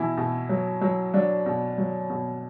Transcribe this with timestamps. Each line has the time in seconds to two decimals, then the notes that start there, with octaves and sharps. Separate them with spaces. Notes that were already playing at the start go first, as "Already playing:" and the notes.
Already playing: B2 E3 E4
0.17 B2
0.49 F#3
0.81 F#3
1.14 F#3 D4
1.46 B2
1.78 F#3
2.10 B2